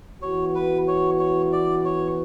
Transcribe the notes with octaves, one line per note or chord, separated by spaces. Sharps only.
E3 B3 F#4 C#5
B4
C#5
C#5
D5
C#5